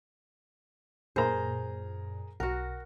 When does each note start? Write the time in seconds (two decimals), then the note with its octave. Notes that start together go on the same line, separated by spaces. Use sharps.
1.16 F#2 A#2 G#4 A#4 C5 A#5
2.40 B1 F#4 A#4 F#5